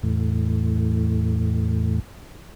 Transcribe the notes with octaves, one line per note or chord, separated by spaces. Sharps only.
E2 A2